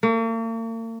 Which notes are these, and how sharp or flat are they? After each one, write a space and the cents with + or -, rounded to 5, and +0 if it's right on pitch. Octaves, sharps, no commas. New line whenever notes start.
A#3 -45